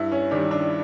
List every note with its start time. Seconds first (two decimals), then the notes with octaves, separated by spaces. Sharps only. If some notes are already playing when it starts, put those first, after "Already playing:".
Already playing: G2 E4
0.12 C#4
0.31 D#3 G3 D4
0.51 D4